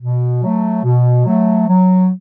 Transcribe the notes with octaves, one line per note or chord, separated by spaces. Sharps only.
B2
F#3 A3
B2
F#3 A3
F#3